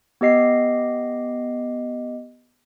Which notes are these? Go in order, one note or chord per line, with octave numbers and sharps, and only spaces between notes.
B3 G4 D#5 C7